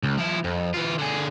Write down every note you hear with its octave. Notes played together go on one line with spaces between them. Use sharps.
C#2
F3 E4
F2
E3 F4
D3 G#4